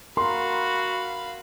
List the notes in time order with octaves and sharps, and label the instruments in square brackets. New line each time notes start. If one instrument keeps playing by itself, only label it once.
[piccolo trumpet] F#4 [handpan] A#4 [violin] F5 B5 [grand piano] C6